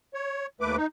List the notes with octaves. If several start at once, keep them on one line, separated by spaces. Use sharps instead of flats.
C#5
D#2 A3 B4 D6
D#4